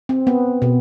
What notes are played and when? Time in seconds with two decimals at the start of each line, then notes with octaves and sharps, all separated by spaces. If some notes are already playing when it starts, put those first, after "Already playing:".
0.09 C4
0.27 B3
0.62 B2